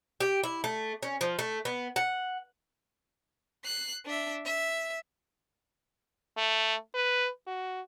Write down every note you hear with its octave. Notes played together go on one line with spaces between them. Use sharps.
G4
E4
A3
C#4
F3
A3
B3
F#5
F#6 C7
D4 E5
E5
A3
B4
F#4